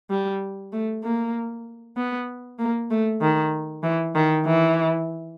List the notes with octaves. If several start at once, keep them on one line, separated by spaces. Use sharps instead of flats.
G3
A3
A#3
B3
A#3
A3
D#3
E3
D#3
E3